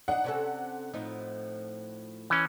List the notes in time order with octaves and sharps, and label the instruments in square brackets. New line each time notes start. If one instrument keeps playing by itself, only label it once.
[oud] D4 D#4 [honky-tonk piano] F#5
[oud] C3 C#4 A4
A2 F3 D#4
[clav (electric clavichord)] E3 C#4